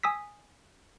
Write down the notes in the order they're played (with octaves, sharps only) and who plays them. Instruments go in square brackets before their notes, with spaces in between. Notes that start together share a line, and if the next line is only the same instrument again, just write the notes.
[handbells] G#5 D#6 E6 B6